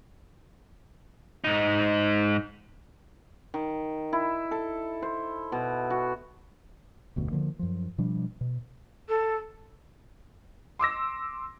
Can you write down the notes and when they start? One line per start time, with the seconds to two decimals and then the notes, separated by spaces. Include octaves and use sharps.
1.44 G#2 D#4
3.54 D#3
4.13 E4
4.51 A4
5.02 C5
5.52 B2
5.90 F#4
7.16 F1 D2 B2
7.31 D3 F3 A#3
7.59 F#2 F3
7.98 B2 F3 G3 D4
8.41 B2
9.09 A4
10.79 C6 D6 E6 A#6